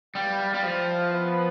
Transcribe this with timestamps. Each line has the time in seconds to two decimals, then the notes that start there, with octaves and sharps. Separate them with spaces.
0.15 G3 E4 B4 F5
0.54 G3
0.63 F3
1.10 B3 E4 B4